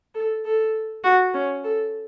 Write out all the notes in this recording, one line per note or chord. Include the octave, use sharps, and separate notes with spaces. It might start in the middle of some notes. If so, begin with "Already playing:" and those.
A4
A4
F#4
C#4
A4